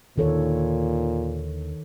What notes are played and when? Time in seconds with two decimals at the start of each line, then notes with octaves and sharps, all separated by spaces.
0.18 D#2 A#2 D3 D#3 A4 C#5